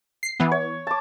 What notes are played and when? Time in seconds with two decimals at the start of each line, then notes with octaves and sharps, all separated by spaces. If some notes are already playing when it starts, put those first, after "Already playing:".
0.23 C7
0.40 E3 B3
0.52 C#5
0.87 A5 D6